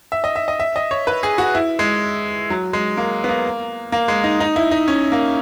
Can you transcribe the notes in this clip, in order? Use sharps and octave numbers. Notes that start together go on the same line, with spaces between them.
E5
D#5
E5
D#5
E5
D#5
C#5
B4
G#4
F#4
E4
G#3
F#3
G#3
A#3
B3
A#3
A#3
G#3
D#4
D#4
E4
D#4
C#4
A#3